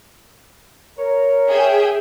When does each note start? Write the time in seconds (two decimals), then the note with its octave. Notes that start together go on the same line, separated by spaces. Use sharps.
0.98 A#4 C#5
1.49 G#4 E5 G5